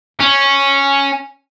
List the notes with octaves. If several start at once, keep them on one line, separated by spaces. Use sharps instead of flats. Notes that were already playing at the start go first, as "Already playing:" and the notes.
C#4